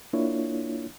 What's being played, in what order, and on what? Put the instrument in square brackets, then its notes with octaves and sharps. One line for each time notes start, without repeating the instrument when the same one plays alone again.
[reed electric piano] A#3 D4 E4 F4 C#5